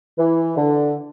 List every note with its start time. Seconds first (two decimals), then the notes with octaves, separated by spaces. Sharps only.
0.18 E3
0.57 D3